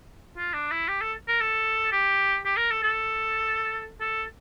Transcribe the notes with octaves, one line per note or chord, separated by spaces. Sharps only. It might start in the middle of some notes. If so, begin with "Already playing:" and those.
F4
D4
E4
G4
A4
A#4
A4
G4
G4
A#4
A4
A4
A4